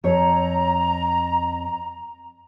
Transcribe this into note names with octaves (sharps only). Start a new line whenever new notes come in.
F2 C#5 A#5